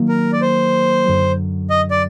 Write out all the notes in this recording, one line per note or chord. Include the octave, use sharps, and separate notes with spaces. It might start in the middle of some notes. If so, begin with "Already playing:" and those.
Already playing: D#3 F#3 A#3
A#4
D5
C5
F#2 D3 F#3
D#5
D5